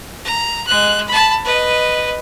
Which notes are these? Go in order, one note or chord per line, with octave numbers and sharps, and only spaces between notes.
A#5
G#3 F#6
A5 B5
B4 D#5